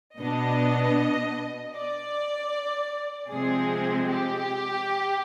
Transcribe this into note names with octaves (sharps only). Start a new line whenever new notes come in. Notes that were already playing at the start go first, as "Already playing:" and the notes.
B2 B3 D4 D#5
D5
C3 F3 G#3 C4 G#4
G4